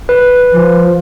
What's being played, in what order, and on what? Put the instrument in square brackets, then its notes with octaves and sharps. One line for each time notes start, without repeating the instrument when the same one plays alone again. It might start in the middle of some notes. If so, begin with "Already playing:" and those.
[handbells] B4
[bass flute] F3